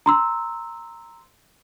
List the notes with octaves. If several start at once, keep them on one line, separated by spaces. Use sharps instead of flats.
A#5 C6 E6